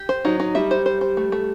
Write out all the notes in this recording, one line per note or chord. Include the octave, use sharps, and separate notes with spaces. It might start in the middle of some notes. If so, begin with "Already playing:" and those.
Already playing: G4
C5
F#3 D#4
D#4
G3 E5
C5
C5
C5
A3
A3